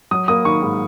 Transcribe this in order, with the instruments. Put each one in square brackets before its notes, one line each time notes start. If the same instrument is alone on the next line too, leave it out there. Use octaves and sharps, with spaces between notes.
[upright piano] F#3 D#6
A#3 D#6
D#3 C#6
G#2